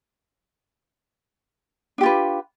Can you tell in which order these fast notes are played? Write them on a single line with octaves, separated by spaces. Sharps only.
D4 G4 F4 B4